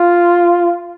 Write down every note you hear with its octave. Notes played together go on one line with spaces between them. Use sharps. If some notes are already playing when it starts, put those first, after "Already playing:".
Already playing: F4